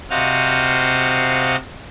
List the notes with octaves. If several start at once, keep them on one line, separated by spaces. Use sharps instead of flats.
C3 F#4 C5 D#5 F5